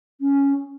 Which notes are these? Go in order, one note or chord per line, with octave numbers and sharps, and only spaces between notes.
C#4